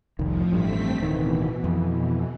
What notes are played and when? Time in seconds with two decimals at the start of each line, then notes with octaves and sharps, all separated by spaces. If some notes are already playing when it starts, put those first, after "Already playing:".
0.19 F1 C2 F2 A2 D#3 F3
0.53 A1 G2 A3 C4 B6
1.00 D1 B2 D#3 E3
1.64 F2